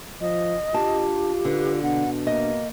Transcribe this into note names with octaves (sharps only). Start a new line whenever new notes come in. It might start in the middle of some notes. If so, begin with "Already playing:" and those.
F3 D#5
D4 F4 G4 A5
D3 B4
B2 D4 F#5
A#3 D#5